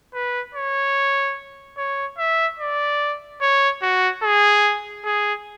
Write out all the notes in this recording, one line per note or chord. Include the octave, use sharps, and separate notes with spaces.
B4
C#5
C#5
E5
D5
C#5
F#4
G#4
G#4